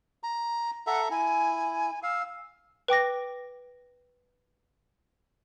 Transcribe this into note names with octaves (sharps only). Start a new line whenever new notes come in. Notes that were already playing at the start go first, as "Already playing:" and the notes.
A#5
A4 E5 F#5 A#5
E4 G#5
F5 E6
B4 G5 D6 A#6